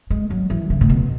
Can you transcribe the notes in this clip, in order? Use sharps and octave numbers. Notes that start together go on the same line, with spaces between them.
G#3
F#3
E3
C#3
A2
B2